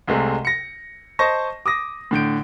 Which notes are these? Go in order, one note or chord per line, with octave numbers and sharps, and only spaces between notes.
C2 C3 G#3 A3
A#6 C#7
C5 D#5 A5 C#6 A#6
D6 D#6 A#6
A2 D3 G6 D7